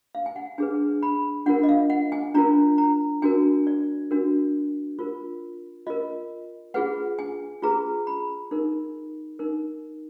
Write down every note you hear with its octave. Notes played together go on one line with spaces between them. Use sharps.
F5
G#5
F#5
D4 G#4 B4 G#5
B5
D4 F4 A#4 F#5
D#5
F5
F#5
G#5
D4 F4 A#4 A#5
A#5
D4 F#4 A#4 G#5
D5
D4 F#4 A#4
F4 A#4
F4 A#4 D#5
F4 G#4 B4 F#5
G#5
F4 G#4 B4 A#5
B5
D#4 A#4
D#4 A#4